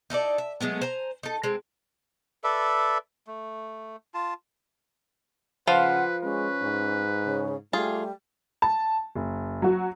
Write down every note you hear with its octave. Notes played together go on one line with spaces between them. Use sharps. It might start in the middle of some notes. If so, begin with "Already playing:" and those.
D#4 E4 A4 D5
E5
F#3 G#3 A3 B3
C5 G#5 A#5
D#4 A4
G#3 C4
A4 B4 D5 E5
A3
F4 A5
C#3 F3 F4 B4 F5 F#5
G#3 C#4 B4
G#2
C#3
G3 A3 F4 G#4
A5
F#1
F#3 F#4